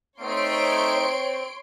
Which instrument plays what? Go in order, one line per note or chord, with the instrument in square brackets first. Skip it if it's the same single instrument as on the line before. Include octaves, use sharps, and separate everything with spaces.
[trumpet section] A3 D#4 [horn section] C4 [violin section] C#5 C6 D7